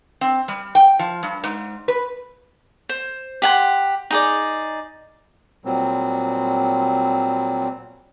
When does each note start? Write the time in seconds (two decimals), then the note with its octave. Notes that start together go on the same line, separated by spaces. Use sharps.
0.21 C4
0.48 G3
0.75 G5
0.99 F3
1.23 G2
1.44 G#2
1.88 B4
2.89 C5
3.42 G4 F#5 G#5 C6
4.11 D#4 G#4 D5
5.65 A#2 F#3 G3 C4